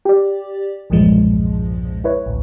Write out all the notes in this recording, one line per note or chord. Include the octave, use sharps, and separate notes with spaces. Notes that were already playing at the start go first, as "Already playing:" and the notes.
G4 D5
B1 E2 G2 A#2 F3 G#3
E4 B4 C#5
A1 D2